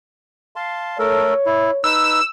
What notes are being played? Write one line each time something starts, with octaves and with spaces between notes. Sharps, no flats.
F5 A5 C6
A3 A4 A#4 C#5
E4
D#4 B4 E6